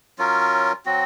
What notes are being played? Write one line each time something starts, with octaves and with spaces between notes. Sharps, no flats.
F#3 C#4 F4 A#4
F#3 C4 F#4